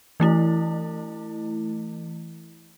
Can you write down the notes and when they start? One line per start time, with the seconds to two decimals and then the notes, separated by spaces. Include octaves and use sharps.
0.20 E3 A3 E4